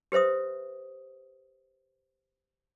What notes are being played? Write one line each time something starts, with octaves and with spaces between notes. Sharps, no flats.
G4 B4 C5 E5 D#6